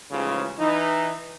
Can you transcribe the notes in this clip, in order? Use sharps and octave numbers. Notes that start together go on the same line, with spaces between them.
A1 G#2 C#3 F3 F4
E3 D#4